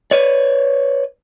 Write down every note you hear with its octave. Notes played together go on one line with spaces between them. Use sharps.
B4 C#5 D5